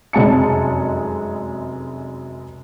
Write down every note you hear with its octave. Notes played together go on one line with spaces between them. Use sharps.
F1 F#2 G#3 A5 C#7